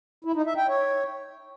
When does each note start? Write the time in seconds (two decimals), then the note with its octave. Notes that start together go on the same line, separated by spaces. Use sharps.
0.25 E4
0.35 D#4
0.46 E5
0.57 G5
0.68 C#5